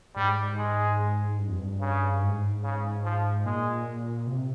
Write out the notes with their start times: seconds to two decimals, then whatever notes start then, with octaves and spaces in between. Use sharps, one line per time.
0.16 G#2 G3
0.57 G#3
1.39 G2
1.48 F2
1.56 G2
1.81 C#3
2.22 G#2
2.63 C#3
3.04 F3
3.45 A#2 G#3
4.27 C3